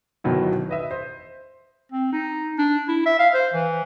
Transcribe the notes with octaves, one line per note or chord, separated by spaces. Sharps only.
G1 B2 D#3 F#3 E4
B4 D#5 E5
C5
C4
D#4
D4
E4
E5
F5
C5
E3